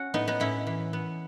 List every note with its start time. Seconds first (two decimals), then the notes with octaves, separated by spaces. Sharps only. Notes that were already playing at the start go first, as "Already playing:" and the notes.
Already playing: C#4 F#4
0.14 A2 B3 D#4
0.28 B3 D#4
0.40 A2 C#4 E4
0.67 E3
0.93 B3